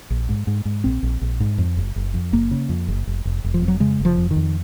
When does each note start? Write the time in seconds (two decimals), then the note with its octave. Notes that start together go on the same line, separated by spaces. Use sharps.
0.10 A#1
0.29 G#2
0.47 G#2
0.65 G#2
0.84 A#1 C4
1.03 A#1
1.21 A#1
1.40 G#2
1.58 F2
1.77 F#1
1.96 F#1
2.14 F2
2.33 F#1 A#3
2.51 C#3
2.69 F2
2.88 F#1
3.07 F1
3.25 F1
3.44 F1
3.54 F3
3.62 F2
3.68 F#3
3.80 C#3 G#3
3.99 F1
4.05 F3
4.18 F2
4.31 D#3
4.36 F2